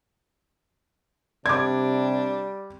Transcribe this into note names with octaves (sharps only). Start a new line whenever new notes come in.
C3 G3 D4 D6 G#6